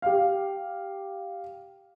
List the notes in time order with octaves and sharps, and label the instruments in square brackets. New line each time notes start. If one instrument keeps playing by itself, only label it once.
[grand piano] G4 F5